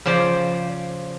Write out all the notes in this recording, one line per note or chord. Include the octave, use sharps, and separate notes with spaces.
C#3 F3 C5 D5